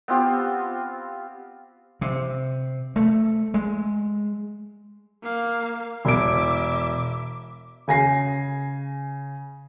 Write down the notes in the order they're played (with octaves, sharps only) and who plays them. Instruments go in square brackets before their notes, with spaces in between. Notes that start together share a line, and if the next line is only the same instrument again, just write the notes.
[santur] B3 C4 F4 G4
[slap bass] C3
A3
G#3
[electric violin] A#3 F5
[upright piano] E1 D7 [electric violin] E5 D6
[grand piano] C#3 G#5 A#6 C7